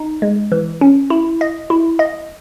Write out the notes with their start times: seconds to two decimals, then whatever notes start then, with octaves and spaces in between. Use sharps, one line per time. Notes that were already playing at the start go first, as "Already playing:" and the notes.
Already playing: D#4
0.22 G#3
0.52 E3
0.81 C#4
1.10 E4
1.41 D#5
1.70 E4
1.99 D#5